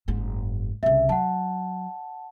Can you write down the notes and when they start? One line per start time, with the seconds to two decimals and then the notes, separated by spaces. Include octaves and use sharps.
0.08 F#1 G#2
0.83 C2 C#3 E5
1.09 F#3 F#5 A5